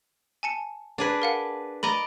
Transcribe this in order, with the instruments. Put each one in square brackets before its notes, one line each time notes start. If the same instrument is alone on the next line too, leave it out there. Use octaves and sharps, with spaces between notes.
[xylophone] G#5 A5 C#7
[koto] D4 G#4 B4
[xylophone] A#4 F5 F#5
[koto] D5 D#5 A#5 [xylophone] B5